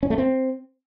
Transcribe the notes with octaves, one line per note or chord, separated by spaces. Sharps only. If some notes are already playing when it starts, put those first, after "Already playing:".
C#4
A3
C4